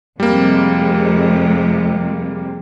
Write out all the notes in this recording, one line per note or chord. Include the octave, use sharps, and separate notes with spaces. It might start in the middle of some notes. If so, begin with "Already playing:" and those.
F2 C3 G3 G#3 A#3